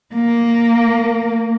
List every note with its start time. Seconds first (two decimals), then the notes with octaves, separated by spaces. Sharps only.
0.14 A#3